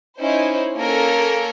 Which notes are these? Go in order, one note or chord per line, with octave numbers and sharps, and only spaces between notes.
C#4 D#4 E4 C5
A#3 C#4 A4 A#4